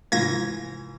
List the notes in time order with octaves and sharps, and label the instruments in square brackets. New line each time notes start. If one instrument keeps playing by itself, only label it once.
[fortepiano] G#2 E3 F3 [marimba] C3 F5 [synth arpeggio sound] G#6 A#6